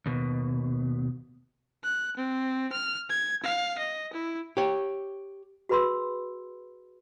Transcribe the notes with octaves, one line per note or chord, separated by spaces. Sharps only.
D#2 B2
F#6
C4
F6
G#6
F5
D#5
E4
G4 C#5
F#4 G#4 B4 B5 C6 E6